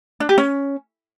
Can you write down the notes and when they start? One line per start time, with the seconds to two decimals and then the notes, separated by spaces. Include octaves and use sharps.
0.20 D4
0.29 G4
0.38 C#4